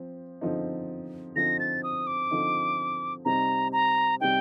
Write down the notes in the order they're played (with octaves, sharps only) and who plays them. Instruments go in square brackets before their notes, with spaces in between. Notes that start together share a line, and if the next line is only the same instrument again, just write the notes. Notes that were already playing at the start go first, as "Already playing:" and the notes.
Already playing: [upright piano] F3 C4
D3 F3 C4 D#4
[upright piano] D3 F3 C4 D#4 [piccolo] A#6
[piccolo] A6
D#6
D6
[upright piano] D3 F3 C4 D#4
[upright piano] C3 G3 C4 D#4 [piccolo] A#5
[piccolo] A#5
[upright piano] C3 G3 C4 D#4 [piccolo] G5